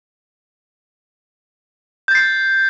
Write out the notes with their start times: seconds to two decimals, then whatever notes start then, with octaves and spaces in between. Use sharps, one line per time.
2.08 G6
2.12 A6
2.15 C7